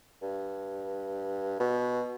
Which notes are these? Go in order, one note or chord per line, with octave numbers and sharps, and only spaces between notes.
G2
B2